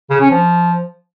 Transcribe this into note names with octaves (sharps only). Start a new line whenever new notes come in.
C#3
C#4
F3